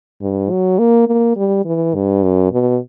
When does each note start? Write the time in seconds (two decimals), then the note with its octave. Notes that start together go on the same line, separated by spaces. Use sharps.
0.21 G2
0.50 F#3
0.79 A#3
1.07 A#3
1.36 G3
1.65 E3
1.94 G2
2.23 F#2
2.51 B2